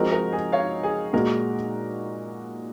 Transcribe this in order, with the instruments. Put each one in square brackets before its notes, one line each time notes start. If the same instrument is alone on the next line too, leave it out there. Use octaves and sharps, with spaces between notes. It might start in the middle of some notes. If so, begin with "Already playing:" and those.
Already playing: [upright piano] F3 G#3 C4 D#4 F#4 [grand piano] A#4
[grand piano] A#4
G#4
C#5 F5
G#4
[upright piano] A#2 G#3 D#4 F#4 [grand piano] A#4